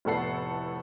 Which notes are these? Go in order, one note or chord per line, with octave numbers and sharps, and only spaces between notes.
F1 A2 B3 A4 F#5 C7